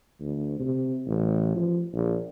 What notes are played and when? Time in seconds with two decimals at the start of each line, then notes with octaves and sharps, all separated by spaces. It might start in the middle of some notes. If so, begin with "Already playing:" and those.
0.21 D2
0.59 C3
1.07 A1
1.55 F3
1.93 A#1